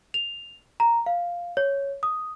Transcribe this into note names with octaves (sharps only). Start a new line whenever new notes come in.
F7
A#5
F5
C#5
D#6